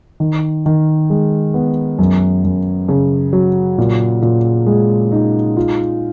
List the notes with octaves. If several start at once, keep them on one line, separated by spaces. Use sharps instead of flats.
D#3
D#3
G#3
B3
F#2
F#2
C#3
F#3
A#2
A#2
G#3
D#4
F4